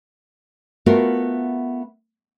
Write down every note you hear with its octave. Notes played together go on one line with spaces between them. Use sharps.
A3 B3 F4 F#4 A#4 B4